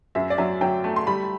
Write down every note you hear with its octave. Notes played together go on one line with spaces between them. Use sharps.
F#2 E5
D5
F#3 E5
F#3 G5
A3
C6
G3 B5